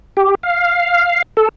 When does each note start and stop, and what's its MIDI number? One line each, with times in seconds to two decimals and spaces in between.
0.17 0.35 67
0.43 1.22 77
1.37 1.49 69